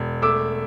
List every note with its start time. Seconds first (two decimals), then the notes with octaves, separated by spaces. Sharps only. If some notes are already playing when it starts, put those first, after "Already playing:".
Already playing: E1
0.22 A3 D6 E6